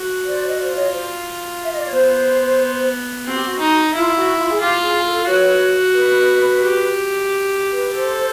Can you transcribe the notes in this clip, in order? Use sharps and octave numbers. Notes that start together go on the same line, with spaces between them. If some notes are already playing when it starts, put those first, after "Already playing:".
Already playing: F#4
C5 D5
D#5
F4 C5 D5
C#5 D#5
C5 D5
E5
D#5
D5
C#5
B3 C5
C4 F#4
G4
F#4
D#4
E4 F4
F#4
F4
G#4
F4 G4
G#4
A4
F#4 B4 C#5
B4
G4
B4
A4 C5